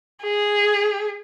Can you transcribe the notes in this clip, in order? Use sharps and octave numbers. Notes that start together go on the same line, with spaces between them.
G#4